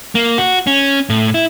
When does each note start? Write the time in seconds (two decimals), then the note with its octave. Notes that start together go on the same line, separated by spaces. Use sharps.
0.15 A#3
0.38 F#4
0.67 C#4
1.10 A2
1.34 E4